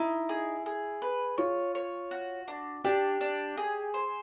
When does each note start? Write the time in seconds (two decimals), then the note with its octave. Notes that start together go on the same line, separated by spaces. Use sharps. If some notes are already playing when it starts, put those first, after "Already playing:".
Already playing: D#4 E4
0.29 G#4
0.66 G#4
1.02 B4
1.38 F4 C#5
1.75 C#5
2.11 F#4
2.48 D4
2.84 D4 G4
3.21 D4
3.57 G#4
3.94 C5